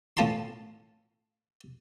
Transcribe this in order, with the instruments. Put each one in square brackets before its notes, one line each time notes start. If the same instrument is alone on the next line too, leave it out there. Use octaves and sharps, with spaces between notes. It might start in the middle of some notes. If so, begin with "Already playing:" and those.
[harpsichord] A2 C#4 F4 A5 B5 C6